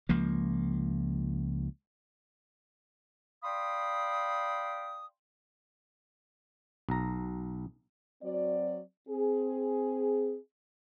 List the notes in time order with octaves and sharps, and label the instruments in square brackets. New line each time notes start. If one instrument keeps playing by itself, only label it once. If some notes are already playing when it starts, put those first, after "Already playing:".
[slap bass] C#2 F3 A#3
[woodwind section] D5 F5 G5 B5 C6 D#6
[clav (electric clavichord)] B1 A#5
[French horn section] F#3 C4 F#4 D5
C4 G#4